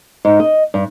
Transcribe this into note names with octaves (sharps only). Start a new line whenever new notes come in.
G#2
D#5
G2